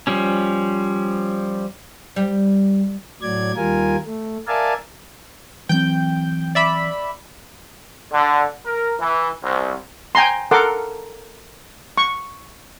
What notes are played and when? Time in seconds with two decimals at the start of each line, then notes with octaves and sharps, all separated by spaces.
0.07 F3 G3 C#4
2.16 G3
3.22 A2 F#3 D5 G#6
3.56 D#2 G3 F4 A#4 G#5
4.06 A3
4.47 A#4 D5 E5 F5 G#5 A5
5.69 E3 F#3 C4 G5 G6
6.55 D5 E5 B5
8.13 D3
8.66 A#4
9.00 E3
9.44 C2
10.15 G5 G#5 A#5 C6
10.51 A4 A#4 F#5 C6 D6
11.98 C#6